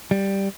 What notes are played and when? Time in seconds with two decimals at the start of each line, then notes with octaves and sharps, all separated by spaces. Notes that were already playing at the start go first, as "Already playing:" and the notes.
0.11 G3